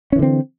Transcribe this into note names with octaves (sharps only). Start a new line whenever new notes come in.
D3 E3 C4 C#4